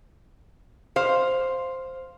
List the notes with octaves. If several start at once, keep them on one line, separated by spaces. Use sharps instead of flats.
C5 F5